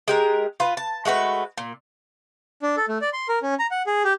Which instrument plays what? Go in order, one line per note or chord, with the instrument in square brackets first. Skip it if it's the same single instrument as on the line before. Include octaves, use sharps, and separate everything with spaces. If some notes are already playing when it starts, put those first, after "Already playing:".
[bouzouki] G#3 G4 A#4
F4 B4
A5
G#3 A3 F#4 B4
A#2
[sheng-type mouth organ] D4
A4
A3
D5
C6
A#4
C#4
A#5
F#5
G#4
G4